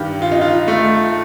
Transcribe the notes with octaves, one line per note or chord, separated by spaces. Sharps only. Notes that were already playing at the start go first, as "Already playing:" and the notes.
Already playing: G2 D#3 G4
F4
D#4
F4
A3